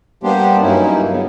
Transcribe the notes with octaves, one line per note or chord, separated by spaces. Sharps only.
G3 A#3 B3 D4 G4 C5
G2 F#3 A#3 C#4 D#4 E4
C#3 F#3 B3